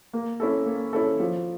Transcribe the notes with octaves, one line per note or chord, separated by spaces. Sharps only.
A#3
C#4 E4 A4
A#3
C#4 E4 A4
F3